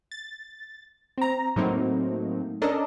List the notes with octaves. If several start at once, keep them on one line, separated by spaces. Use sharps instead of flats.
A6
C4 A#5
A2 F#3 A3 A#3 C4 D#4
C#4 D4 A4 A#4 D5 D#5